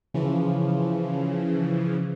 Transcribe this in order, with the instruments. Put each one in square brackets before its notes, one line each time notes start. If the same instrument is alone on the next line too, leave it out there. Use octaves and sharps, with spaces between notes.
[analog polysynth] C#3 E3 F3